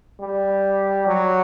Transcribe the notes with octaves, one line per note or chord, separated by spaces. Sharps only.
G3
F#3